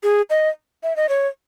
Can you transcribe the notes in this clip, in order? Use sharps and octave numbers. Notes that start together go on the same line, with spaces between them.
G#4
D#5
E5
D#5
C#5